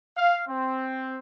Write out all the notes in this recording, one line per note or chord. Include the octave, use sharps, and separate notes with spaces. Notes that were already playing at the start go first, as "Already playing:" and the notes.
F5
C4